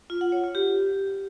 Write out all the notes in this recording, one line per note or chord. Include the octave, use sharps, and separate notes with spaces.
F4
F#5
C#5
F4
G4